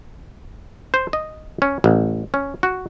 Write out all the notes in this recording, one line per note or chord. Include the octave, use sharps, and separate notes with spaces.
C5
D#5
C#4
A1
C#4
F#4